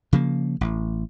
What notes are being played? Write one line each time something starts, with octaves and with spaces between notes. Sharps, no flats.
C#3 F3 A#3
A1